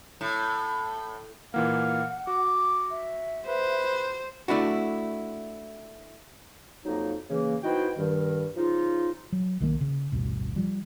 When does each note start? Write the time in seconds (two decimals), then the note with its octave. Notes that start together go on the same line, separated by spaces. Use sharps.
0.21 A2
1.54 A#2 E3 A#3 F5 F#5
2.27 F#4 D6
2.91 E5
3.47 B4 C5
4.48 A3 D4 E4 F#4
6.86 F2 F#3 A#3 D#4
7.30 C#3 E3 A#3
7.64 B3 D#4 E4 F#4 C5 G5
7.98 G2 D#3 G3
8.57 C#3 F3 D#4 F4
9.32 F#3
9.60 B1 D#3 F#3 A#3
9.81 C#3
10.12 A1 D2 G2 B2
10.56 F3 G3